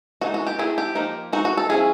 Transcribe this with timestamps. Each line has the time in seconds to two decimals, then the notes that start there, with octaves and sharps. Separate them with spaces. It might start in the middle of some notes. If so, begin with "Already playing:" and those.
0.21 E3 G#3 B3 D#4 F#4
0.34 F#4
0.47 G4
0.59 A3 C4 E4 G#4
0.78 G4
0.95 F3 A#3 D#4
1.32 G#3 C4 D#4 F#4
1.45 F#4
1.57 A4
1.69 F3 A#3 C#4 E4 G#4